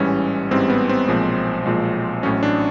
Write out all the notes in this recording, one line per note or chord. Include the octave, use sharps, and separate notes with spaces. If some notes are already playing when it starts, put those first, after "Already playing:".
Already playing: A1 G#2 E3 G3 C#4
A1 G#2 E3 G3 C4
B3
C4
B1 A#2 F3 G#3
B1 A#2 F3 G#3
A1 A2 F#3 C#4
D4